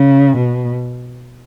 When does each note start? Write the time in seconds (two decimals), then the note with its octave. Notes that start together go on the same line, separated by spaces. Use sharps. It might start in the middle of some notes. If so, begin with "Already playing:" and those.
Already playing: C#3
0.37 B2